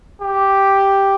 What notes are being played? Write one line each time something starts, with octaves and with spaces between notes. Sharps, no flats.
G4